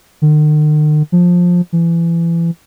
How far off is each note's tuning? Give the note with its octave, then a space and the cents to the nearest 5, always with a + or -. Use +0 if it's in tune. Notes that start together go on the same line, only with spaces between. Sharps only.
D#3 -45
F3 +15
E3 +30